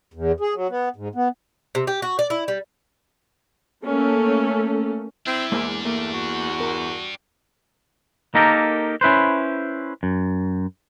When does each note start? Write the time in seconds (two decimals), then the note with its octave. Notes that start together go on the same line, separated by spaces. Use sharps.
0.14 E2
0.40 G#4
0.54 F#3
0.69 B3
0.96 G#2
1.15 B3
1.75 C3
1.87 G4
2.02 F#4
2.19 D5
2.30 E4
2.48 G3
3.85 A3 A#3 C#4 A4
5.27 C4 D4 E4 G4
5.52 E2 G#3 A#3 C5
5.85 A3 A#3
6.14 F#4
6.60 A#4
8.35 A#3 D#4 G4 A4 A#4
9.01 C#4 E4 B4 C5
10.03 F#2